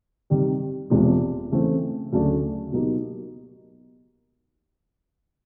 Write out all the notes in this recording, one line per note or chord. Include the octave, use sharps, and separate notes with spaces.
C3 D#3 G3
E1 E2 C3 F3 G#3
C#3 E3 A3 C4
D2 C#3 F#3 A3 D4
B2 F#3 A#3 D#4 G4